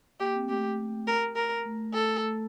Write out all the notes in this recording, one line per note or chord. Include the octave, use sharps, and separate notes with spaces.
A#3 G4
C4
A3 G4
A#4
A#4
A3
A4
A3